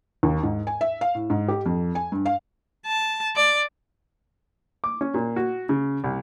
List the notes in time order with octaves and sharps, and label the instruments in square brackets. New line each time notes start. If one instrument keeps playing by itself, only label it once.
[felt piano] D#2
G#2
G#5
E5
F5
A2
G#2
G4
F2
G#5
G2
F5
[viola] A5
D5
[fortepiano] D6
C#4
A#2
F#4
C#3
C2